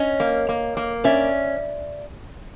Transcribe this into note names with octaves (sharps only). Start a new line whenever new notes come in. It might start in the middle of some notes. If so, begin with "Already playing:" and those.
Already playing: C#4 C#5 D#5
A#3
A#3
A#3
C#4 D5 E5